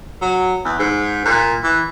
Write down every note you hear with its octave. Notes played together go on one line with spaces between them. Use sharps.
F#3
E2
G#2
A#2
E3